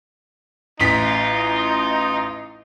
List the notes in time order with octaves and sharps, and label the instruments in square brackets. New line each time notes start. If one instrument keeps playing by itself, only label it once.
[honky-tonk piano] A1 B6 [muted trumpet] D#4 [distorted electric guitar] F4